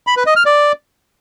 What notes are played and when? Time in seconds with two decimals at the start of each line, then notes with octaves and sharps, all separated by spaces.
0.07 B5
0.17 B4
0.26 D#5
0.36 F6
0.46 D5